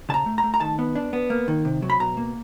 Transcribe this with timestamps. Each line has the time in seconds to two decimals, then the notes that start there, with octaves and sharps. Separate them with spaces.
0.09 C#3 A5
0.14 A#5
0.26 A3
0.38 A#5
0.43 A3
0.54 A#5
0.60 D#3 A5
0.79 B3
0.96 D4
1.13 B3
1.30 A#3
1.48 D#3
1.65 C3
1.82 F#3
1.90 B5
1.99 B2 A#5
2.17 A#3